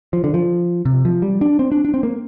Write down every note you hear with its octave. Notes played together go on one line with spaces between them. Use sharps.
F3
D3
F3
C3
F3
G3
D4
C4
D4
D4
C4
A#3